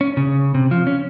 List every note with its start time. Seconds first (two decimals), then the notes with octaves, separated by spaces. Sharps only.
0.01 C#4
0.17 C#3
0.54 C3
0.71 F3
0.87 C#4